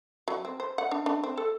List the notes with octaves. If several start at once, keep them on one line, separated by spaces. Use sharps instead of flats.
F#3
C4
C5
F#5
D4
D4
C4
A4